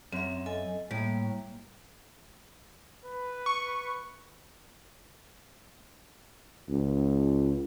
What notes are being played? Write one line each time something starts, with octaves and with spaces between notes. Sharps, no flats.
F#2 C4 E5
A4 D#5 G#5
A2 G3 A#3
B4
C#6
C#2